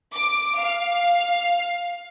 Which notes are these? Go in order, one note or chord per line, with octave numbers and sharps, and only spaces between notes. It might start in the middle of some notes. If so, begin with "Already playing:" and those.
D6
F5